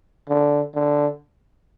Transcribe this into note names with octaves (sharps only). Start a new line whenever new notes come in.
D3
D3